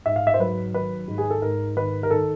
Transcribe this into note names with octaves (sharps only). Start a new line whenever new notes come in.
G#2 E5
F5
E5
C5
F#3 B4
D#3 B4
G#2
G#4
A4
G#2 A#4
D#3 B4
A#4
D#3 A4